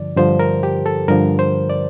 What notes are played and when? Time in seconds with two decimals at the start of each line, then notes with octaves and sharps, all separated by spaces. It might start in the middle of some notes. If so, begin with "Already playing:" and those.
Already playing: G2 D3 F3 D5
0.16 G2 D3 F3 C5
0.39 A#4
0.63 G4
0.86 A4
1.08 G2 D3 F3 A#4
1.39 C5
1.70 D5